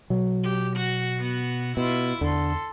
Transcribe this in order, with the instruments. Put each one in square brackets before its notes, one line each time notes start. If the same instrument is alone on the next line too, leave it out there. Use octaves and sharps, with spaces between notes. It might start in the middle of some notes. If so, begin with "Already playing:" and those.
[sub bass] B2 [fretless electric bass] F#3
[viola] G4
F#4
B3 F#4
[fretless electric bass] B2 [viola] E4 F4
[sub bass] E2 [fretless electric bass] D3 [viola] A4 C6